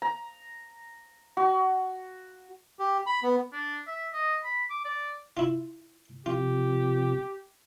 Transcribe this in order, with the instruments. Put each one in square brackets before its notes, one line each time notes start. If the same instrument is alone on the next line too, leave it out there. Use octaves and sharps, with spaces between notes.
[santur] A#5
F#4
[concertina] G4
B5
B3
[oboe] D4
E5
D#5
B5
D6
D5
[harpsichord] E4 F4
[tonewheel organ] C3 F3 [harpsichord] F4 [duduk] G4